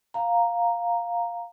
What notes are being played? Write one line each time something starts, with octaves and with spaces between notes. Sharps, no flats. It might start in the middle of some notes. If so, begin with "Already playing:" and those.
F5 A#5